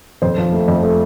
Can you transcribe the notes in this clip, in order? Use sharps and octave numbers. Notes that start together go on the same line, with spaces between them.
F2 C5
F3
A3
F2
A3